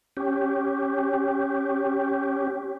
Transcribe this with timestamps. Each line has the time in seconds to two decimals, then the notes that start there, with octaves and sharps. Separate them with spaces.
0.17 C#4 G4